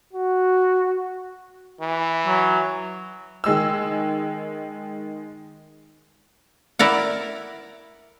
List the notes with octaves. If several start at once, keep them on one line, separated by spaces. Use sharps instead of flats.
F#4
E3
F#3
D#3 G#3 E6
E4 A#4 D5 F#5